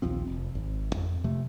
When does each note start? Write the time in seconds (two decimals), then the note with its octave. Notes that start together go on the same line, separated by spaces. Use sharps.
0.02 A#1 D#2 F3 C4
0.27 F1
0.55 G#1
0.95 F2
1.24 C3 F3 A3